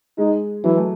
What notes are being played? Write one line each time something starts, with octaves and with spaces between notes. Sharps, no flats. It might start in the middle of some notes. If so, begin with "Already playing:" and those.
G#3 D#4
E3 F#3
A3